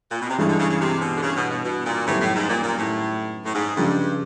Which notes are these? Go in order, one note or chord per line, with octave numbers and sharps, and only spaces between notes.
A#2
B2
C3
G2 C#3 E3 G#3
D3
C#3
C#3
C3
B2
D3
C#3
B2
B2
B2
A#2
F#2 A2 D#3 G3 B3
A2
G#2
A#2
A#2
A2
A2
G#2
G2 C#3 F3 G#3